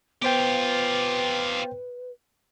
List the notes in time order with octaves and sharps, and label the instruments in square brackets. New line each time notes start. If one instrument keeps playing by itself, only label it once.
[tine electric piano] B3 C5 G5 [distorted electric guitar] F4 G4 [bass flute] B4